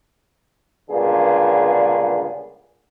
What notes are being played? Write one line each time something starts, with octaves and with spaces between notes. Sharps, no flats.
C#2 G2 A#2 D3 B3 G#4